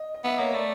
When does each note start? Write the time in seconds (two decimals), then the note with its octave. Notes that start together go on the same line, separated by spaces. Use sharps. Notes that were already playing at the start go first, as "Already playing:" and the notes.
Already playing: D#5
0.14 D#5
0.24 B3 E5
0.39 A#3 C#5
0.54 A3 D5